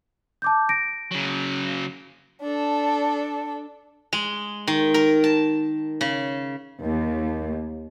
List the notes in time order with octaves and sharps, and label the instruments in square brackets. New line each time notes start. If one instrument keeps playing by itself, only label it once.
[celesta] A5 D6 G6
A#6 D7
[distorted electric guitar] C#3 F#3
[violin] D4 A4
[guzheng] G#3
D#3
A#4
A5
C#3
[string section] D#2